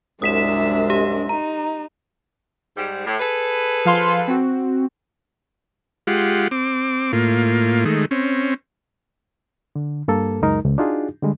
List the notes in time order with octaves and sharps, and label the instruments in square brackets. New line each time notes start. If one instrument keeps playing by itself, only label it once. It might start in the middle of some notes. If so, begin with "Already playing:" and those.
[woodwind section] C2 F#2 G#3 [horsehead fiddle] D4 E5 [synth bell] D#6 B6 E7
[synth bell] G4
[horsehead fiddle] D#4 [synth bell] A#5
[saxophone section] G#2 G3
A2
G#4 A4 B4
[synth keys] F3 F5 C6
C4 F#4
[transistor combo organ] G#3 F4 G4 F#5
C4 D6
A2 A#3 F4
D#3 G#3 A3
C4 C#4
[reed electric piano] D3
G2 A#3 A4
C#2 F#2 G#3 D#4 A#4
C#2
D4 D#4 F4 F#4 G#4
D3 G3 G#3